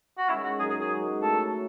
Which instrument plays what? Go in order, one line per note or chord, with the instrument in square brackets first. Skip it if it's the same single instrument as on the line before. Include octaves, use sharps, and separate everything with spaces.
[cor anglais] F#4
[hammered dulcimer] D#3 G#3 C#4 [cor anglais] E4
[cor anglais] F#4
[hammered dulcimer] F#2 D#3 F#3 [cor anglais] G#4
[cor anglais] G#4
G#4
[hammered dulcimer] G#3 D#4 F#4
[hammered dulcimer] A2 F#3 A3 [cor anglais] A4